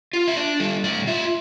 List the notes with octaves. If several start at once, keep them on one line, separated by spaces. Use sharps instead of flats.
F4
E5
D4 D5
G3 A4
A2 D5
F4 E5